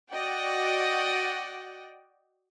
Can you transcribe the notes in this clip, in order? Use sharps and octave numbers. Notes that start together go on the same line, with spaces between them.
F#4 D5 D#5 F#5 G5